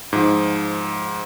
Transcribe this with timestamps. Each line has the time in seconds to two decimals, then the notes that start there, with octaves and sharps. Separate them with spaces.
0.13 G#2 F3